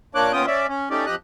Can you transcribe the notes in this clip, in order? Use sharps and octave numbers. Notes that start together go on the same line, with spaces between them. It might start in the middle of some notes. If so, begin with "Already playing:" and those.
A#2 A#3 D4 C#5 D6 F#6
D#2 B3 C#4 F4 G5 D#6
C#4 D5 E5
C#4
A3 C#4 D#4 G4 D5
F2 G4 D#5 F#6